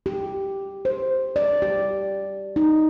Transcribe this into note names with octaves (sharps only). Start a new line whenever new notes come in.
G4
C5
D5
G4
D#4